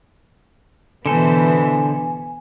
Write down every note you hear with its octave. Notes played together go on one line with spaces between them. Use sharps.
B2 D3 E3 B3 A4 C5 G#5